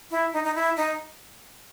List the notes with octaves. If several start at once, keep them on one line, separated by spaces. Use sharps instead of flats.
E4
D#4
D#4
E4
D#4